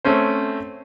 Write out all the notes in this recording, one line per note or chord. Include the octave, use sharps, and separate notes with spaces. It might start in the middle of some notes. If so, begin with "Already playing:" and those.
A3 C4 C#4 C5